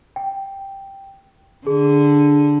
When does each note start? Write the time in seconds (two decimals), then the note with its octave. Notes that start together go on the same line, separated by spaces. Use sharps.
0.16 G5
1.67 D3 G#4